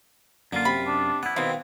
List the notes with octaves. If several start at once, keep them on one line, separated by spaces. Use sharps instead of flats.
F#2 D3 A#3 F4
C3 B5
D4
B3 E4 F#5
B2 D#3 C4 D#4 F5